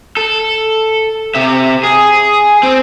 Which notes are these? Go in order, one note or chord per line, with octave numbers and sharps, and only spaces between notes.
A4
C3 E5
G#4
C4